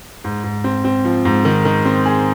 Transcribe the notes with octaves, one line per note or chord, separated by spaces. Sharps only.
G#2
G#2
C4
C4
F3
G#2
D#3
D#3
C4
G#4